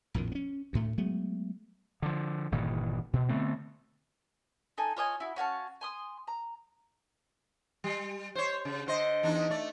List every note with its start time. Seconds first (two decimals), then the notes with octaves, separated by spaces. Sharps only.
0.14 A#1 F2 A2 D#3
0.32 B3 C#4
0.73 D2 A2 A3
0.98 F#3 G#3 A3 B3
2.02 D3 F3
2.52 G1 A#2 D#3 E3
3.13 B2
3.29 D3 A3 B3 C4
4.78 D#4 A4 G#5
4.97 F4 C#5 D#5 G#5
5.20 E4 F#4
5.36 C#4 F#4 F5 A5
5.81 G#5 C6 D#6
6.27 A#5
7.84 G3
8.35 C5 C#5
8.65 C#3
8.86 D3 C5 D#5
9.23 E2 D4 D#4
9.50 A3 D5